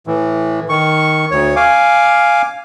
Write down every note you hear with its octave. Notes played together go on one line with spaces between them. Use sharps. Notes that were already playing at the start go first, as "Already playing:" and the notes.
A2 E3
D#3 C#6
D2 C#5
F5 G#5 D6